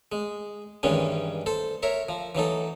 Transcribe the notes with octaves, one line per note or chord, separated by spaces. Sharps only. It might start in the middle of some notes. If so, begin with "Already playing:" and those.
G#3
G2 D#3 E3 G#3 C#4
A4 C5
A#4 C#5 E5
F3
E3 F#3 D#4 A4